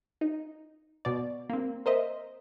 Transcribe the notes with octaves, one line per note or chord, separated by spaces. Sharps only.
D#4
B2 D5
A#3 C4
A#4 C5 D#5 E5